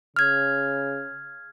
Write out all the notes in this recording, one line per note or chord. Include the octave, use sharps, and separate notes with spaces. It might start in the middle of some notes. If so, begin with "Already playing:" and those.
C#3 F6 G#6